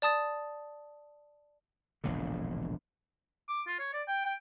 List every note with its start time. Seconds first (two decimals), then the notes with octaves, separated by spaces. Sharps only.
0.02 D5 A5 D#6 A6
2.04 E1 A#1 A2 D3
3.48 D6
3.67 F4
3.79 C#5
3.93 D5
4.08 G5
4.25 G5